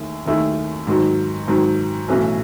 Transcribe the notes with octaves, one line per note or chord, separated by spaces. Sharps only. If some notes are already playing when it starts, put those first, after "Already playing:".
Already playing: D#2 D#3 A3 E4 G#4
D#2 D#3 A3 E4 G#4
G#2 D#3 F#3
G#2 D#3 F#3
B1 A2 E3 A3 C#4